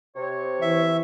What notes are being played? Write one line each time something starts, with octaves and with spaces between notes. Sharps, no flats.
C3 C#5
E3 E5